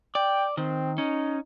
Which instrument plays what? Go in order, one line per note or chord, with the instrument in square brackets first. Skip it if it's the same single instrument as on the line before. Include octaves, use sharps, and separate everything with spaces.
[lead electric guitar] D5 [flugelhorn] G5
[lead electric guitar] D#3 [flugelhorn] C4
[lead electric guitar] C#4 [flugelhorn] D#4